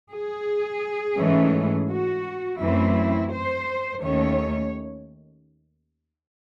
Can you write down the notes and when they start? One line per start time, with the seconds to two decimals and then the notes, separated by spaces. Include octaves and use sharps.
0.11 G#4
1.17 G#2 E3 A3 C#4
1.88 F#4
2.60 F#2 E3 A3 C4 E4
3.31 C5
4.02 D#2 D#3 A3 C#4 C#5